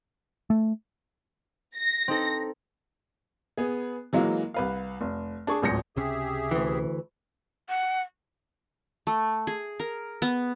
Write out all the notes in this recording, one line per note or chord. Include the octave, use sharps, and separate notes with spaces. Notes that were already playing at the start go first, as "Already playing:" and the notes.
A3
A#6
C4 D#4 A4
B3 G#4
E3 F#3 G#3 A#3 F4
C2 B4 F5
F1
D4 G#4 C#6
D1 G#1 C#2 G6 A#6 C#7
C#2 C3 C#4 G4 G#4 E5
D2 E3
F#5
A3
G#4
A#4
B3